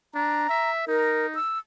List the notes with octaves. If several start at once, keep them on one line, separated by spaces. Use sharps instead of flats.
D4 A#5
E5
D#4 A#4
E6